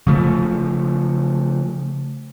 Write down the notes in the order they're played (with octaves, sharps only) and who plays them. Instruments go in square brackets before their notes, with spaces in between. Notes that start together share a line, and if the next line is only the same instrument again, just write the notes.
[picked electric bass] C#3 F3 A3